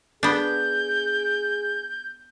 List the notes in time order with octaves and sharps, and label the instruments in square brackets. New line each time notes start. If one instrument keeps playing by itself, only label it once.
[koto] B3 D4 [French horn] G#4 [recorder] G6